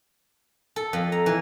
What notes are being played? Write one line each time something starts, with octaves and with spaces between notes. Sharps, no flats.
A4
F2
A#5
E3